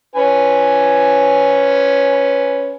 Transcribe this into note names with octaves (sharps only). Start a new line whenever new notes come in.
C#4 B4 G#5